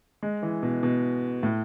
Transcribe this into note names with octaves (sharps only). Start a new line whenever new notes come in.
G#3
E3
B2
B2
A2